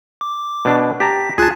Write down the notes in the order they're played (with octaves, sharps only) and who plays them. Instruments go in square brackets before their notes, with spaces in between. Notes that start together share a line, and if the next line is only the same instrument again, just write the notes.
[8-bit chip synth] D6
[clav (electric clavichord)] B2 D4
[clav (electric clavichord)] G4 A5 A#5 [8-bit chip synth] B6
[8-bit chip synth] C#2 F4 F#6 [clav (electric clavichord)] G#4 A5